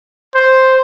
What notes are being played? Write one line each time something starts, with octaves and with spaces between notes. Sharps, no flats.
C5